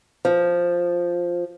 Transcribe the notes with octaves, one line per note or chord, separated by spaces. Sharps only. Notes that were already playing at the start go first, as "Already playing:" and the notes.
F3